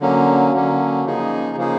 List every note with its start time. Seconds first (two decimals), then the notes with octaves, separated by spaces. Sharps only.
0.01 D3 F#3 A#3 C#4
0.53 D3 F#3 A#3 C#4
1.05 C#3 F3 A#3 D#4 G#4
1.57 C#3 F3 A#3 D#4 G#4